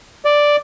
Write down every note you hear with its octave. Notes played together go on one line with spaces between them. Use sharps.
D5